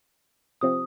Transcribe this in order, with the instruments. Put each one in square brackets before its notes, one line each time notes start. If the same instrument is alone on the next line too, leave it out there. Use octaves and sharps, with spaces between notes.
[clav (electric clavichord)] C3 F3 C4 [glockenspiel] D#6